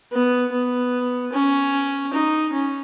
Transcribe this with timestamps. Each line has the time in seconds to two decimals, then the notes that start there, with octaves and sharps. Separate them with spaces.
0.12 B3
0.51 B3
1.33 C#4
2.13 D#4
2.53 C#4